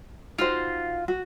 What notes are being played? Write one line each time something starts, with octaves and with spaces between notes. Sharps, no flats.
D#4 F4 F#4 C5
F#4